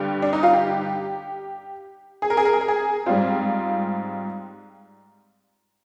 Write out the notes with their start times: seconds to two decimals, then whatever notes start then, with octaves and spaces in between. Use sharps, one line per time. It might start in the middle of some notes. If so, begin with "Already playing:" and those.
Already playing: G2 D3 G3 G4
0.22 D4
0.33 D#4
0.43 F4
0.53 G4
2.22 G#4
2.30 A#4
2.37 G#4
2.45 A#4
2.53 G#4
2.61 A#4
2.68 G#4
3.06 G#2 G3 C4 F4